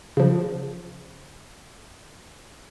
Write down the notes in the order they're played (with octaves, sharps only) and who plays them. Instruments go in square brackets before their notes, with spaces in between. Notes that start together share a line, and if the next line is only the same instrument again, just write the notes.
[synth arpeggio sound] C#3 F3